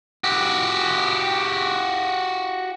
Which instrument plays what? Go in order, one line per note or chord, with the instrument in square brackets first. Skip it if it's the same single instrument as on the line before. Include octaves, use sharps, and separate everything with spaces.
[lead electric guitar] F#4 G4